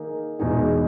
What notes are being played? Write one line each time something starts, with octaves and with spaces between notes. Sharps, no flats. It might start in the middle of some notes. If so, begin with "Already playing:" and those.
Already playing: D#3 A#3 D#4 G#4
E2 B2 G#3 D#4 G#4